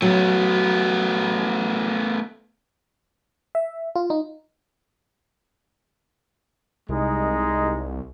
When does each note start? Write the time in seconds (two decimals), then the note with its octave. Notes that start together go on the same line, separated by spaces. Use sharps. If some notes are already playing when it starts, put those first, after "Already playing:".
0.02 F#3 A3 B3
3.55 E5
3.95 F4
4.10 D#4
6.89 C2 G#3 D#4